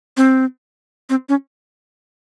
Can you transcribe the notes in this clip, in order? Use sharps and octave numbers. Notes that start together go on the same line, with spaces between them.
C4
C4
C#4